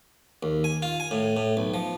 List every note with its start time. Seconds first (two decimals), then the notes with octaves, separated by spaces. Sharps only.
0.43 D#2
0.64 G#5
0.82 F4
1.00 G#5
1.11 A2
1.37 A2
1.57 B1
1.74 F3